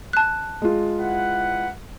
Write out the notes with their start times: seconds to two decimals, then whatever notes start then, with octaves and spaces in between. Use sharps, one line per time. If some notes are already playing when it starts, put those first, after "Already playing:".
0.13 A5 F#6
0.62 G#3 F4
1.00 E4 B4 F#5